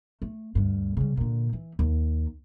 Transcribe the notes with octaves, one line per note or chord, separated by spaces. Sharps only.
A3
D2 G2
C#3 G3
A#2 D3
E3
D#2